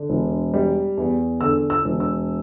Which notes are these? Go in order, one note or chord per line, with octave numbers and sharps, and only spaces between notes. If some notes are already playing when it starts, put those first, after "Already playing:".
Already playing: D3
E1
G3
E2
D3 E6
E6
E1
E6